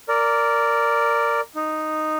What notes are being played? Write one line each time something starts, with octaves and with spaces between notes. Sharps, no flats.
A#4 D5
D#4